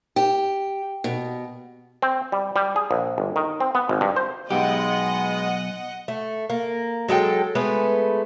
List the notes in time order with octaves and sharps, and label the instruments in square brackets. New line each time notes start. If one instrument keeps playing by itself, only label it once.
[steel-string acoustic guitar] G4
B2
[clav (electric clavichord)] C4
G3
G3
G#4
A#1
G1
D#3
C4
B3
G#1
G2
C5
[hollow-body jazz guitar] B1 G4 [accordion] G#3 B3 [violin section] D#5 F#5
[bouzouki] A3
A#3
F#3 G#3 A4 G5
G#3 A3 B3 B4